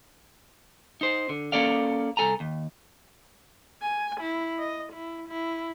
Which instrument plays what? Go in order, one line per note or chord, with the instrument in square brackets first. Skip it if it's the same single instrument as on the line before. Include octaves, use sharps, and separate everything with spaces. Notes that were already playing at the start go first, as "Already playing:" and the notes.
[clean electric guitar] D#4 C5
D3
A#3 C#4 A4 D5 F5
C2 G#3 A4 G#5 A#5
D#2
[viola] G#5
E4
D#5
E4
E4